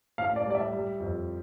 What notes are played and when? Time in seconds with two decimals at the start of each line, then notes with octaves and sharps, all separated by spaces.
0.18 A2 F5
0.36 D5
0.46 G3 D5
0.55 E5
0.73 G3
1.00 F2